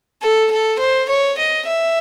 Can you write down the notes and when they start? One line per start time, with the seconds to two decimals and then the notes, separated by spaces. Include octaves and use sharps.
0.22 A4
0.51 A4
0.79 C5
1.09 C#5
1.38 D#5
1.66 E5